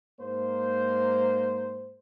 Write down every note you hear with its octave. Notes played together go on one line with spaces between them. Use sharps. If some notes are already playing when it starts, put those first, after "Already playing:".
G#2 A#3 C5